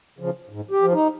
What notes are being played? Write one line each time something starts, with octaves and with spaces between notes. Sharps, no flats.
C#3 F3
G#2
G4
F3
D#4